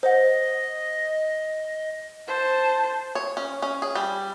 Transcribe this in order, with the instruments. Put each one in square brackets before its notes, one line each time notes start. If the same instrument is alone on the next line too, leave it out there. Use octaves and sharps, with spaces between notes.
[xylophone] C5 F#5 [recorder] D#5
[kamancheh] C5 A5
[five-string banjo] C#5
C#4
C#4
G#4
G3